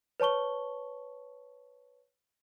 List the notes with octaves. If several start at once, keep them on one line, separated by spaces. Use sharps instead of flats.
B4 C#5 A5 C#6 G7